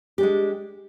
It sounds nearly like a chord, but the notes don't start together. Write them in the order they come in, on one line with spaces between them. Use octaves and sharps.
G4 D4 G#3